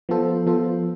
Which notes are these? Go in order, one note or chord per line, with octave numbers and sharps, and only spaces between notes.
F3 B3 F4 A4 C5
F3 B3 F4 A4 C5